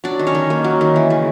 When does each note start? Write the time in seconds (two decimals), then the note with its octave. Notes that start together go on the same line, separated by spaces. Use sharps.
0.04 F#3 D4 D5
0.19 D#3
0.27 C#4 C#5
0.35 D#3
0.50 A#3
0.64 F#3
0.81 D#3
0.96 E3
1.10 C#3